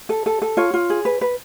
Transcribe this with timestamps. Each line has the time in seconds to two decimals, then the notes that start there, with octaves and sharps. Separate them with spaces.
0.09 A4
0.26 A4
0.42 A4
0.57 F4 C#5
0.74 F4
0.90 G#4
1.05 B4
1.21 B4